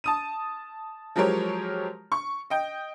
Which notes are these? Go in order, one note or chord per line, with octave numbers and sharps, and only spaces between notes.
A5 D#6 D#7
F3 F#3 G#3 G4 A#4 C#5
C#6
D#5 G5